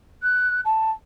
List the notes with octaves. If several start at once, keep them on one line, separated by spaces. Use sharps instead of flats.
F#6
A5